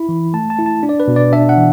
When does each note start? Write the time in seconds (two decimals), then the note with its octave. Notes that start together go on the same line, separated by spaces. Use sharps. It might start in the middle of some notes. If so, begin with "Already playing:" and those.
Already playing: E4 B5
0.09 E3
0.34 A3 A5
0.50 A5
0.59 E4
0.66 A5
0.83 D4
0.89 D5
1.00 B4
1.08 B2
1.16 D5
1.33 D4 E5
1.49 F#5
1.57 E3